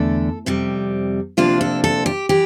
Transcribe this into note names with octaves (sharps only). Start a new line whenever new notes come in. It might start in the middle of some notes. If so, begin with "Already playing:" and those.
Already playing: E2 D3 A3 D4 A4
F2 C3 G3
D2 C3 F3 A#3 D4 F4
A4
A4
G4
E3 G4